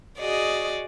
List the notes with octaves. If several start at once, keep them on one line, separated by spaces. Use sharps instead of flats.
F#4 G#4 D5 D#5